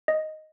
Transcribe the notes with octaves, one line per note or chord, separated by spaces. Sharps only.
D#5